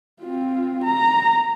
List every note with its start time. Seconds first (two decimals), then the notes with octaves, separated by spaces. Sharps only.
0.21 C4 F4
0.83 A#5